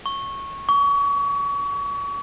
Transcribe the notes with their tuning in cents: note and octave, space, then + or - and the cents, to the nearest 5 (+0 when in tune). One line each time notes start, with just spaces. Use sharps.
C#6 -15
C#6 +35